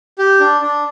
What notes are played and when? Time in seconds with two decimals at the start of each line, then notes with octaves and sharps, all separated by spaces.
0.18 G4
0.40 D4
0.61 D4